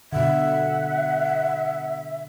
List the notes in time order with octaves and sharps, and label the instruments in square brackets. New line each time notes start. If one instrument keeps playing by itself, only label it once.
[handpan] B2 D3 [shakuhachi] E5 [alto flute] F#5